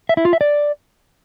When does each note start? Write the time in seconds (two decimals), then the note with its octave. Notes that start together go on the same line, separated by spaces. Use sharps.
0.09 E5
0.17 E4
0.25 F4
0.33 E5
0.41 D5